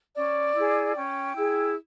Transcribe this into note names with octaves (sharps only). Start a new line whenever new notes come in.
C#4 D5
E4 G#4
C#4 G5
E4 G#4